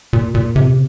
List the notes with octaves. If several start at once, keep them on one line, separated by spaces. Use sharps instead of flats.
A#2
A#2
C3